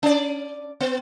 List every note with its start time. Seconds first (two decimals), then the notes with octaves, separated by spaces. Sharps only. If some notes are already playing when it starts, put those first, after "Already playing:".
0.03 C#4 D5
0.80 B3